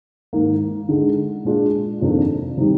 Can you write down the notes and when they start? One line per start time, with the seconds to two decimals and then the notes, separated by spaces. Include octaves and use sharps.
0.33 G#2 D#3 A#3
0.89 D3 G#3 D#4
1.45 A#2 G#3 D4 F4
2.01 F2 C3 D#3 A#3 D4
2.57 C3 D#3 G3